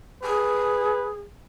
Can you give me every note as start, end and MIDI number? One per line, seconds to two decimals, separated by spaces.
0.24 1.18 68
0.24 1.10 71